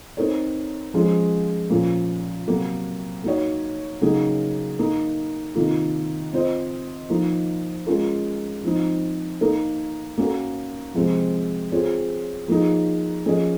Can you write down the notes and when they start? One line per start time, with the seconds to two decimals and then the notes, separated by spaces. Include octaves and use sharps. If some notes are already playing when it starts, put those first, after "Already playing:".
0.17 C4 D#4 A#4 C#5
0.94 F3 G#3 C#4 F4
1.70 A#2 F3 A#3 C#4
2.47 C3 F#3 A#3
3.24 A#3 D#4 F#4 C#5
4.01 C#3 F#3 A#3 D#4 G#4
4.79 A#3 D#4 A#4
5.55 C3 D#3 A#3 F4
6.33 C4 F4 C5 D#5
7.09 F3 A#3 D#4
7.87 G#3 C#4 F4 A#4
8.63 F3 C4 D#4
9.41 A#3 D#4 A#4
10.18 A#3 C#4 F#4 A#4
10.95 C3 F3 G#3 C4 F4
11.72 C4 F4 G#4 C#5
12.48 F3 A#3 D#4 G#4
13.25 F3 A#3 C#4 G#4 D#5